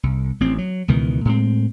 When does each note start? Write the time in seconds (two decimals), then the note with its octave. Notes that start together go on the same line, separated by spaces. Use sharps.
0.03 C2
0.40 A1 C4
0.58 F#3
0.88 C#2 B2 D#3 E3
1.25 A2 G#3 B3 C4